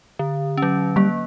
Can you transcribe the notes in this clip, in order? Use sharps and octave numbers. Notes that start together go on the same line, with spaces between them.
D3
F#3 C#4
G3 A#3